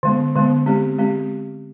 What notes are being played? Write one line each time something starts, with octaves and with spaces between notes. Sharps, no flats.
D3 G#3 B3
D3 G#3 B3
G#3 C4 G4
G#3 C4 G4